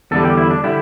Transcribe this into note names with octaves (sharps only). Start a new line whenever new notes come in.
E2 D3 G3 A4
G4
E4
D4
D3 G3 E4